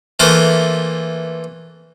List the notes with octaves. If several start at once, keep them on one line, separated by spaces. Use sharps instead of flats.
E3 A3 A#3 E4 F4 C5